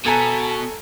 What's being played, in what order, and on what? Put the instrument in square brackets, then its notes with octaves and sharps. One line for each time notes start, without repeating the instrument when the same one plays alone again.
[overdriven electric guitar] B2 [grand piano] A4 G#5 A#5